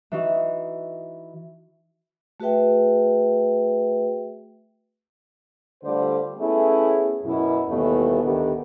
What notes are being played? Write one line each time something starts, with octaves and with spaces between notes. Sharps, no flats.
E3 D#4 F#4
A3 F#4 G#4 B4 E5 G5
D3 G3 A3 F4 C5 D5
A3 B3 C#4 E4 G#4
F#2 B2 E4
D#2 B2 E3 G3 A3 B3
D2 A2 D#3 B3 D4 G4